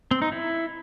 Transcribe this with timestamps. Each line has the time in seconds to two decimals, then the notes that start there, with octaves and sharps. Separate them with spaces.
0.11 C4
0.22 D#4
0.32 E4